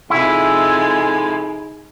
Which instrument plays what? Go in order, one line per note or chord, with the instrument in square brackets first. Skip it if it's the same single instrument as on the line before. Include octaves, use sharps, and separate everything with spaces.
[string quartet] C3 F3 G#3 [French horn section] D#4 G#4 [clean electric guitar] E4 [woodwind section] A4 G#5